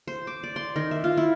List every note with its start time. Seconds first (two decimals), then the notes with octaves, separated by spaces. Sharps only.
0.07 C5
0.27 D6
0.43 D5
0.56 C6
0.76 D#3
0.91 E5
1.04 F4
1.17 E4